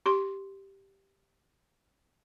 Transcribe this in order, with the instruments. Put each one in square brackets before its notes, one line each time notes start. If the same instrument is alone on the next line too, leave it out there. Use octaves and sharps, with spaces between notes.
[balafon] G4 C6